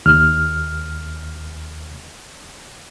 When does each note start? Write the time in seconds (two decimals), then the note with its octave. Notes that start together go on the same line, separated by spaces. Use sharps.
0.06 D#2 F6